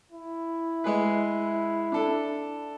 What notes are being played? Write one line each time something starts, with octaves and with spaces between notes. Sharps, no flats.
E4
G#3 G#4 B4
D4 A4